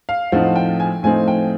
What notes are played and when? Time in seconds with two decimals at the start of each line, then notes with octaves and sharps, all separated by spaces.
0.09 F5
0.32 A2 F3 A3 C4 D#4 F#5
0.56 G5
0.80 G#5
1.03 A2 F3 A3 C4 D#4 G#5
1.28 G5